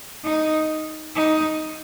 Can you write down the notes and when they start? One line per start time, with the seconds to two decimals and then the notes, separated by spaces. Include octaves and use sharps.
0.24 D#4
1.15 D#4